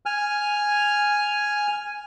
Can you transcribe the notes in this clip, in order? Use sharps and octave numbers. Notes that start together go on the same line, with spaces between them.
G#5 F6